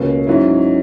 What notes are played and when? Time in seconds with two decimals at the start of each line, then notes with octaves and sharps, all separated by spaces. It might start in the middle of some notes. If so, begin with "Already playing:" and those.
Already playing: C#2 B2 A#3 C#4
0.27 G#2 F#3 C#4 E4